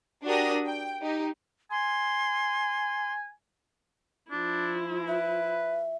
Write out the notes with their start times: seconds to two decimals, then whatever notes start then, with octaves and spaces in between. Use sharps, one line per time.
0.25 D4 F#4 G4 A#4 D#6 A#6
0.66 G5
1.02 D#4 G4
1.71 G#5 C6
4.31 F3 D4 E4
5.08 B4 E5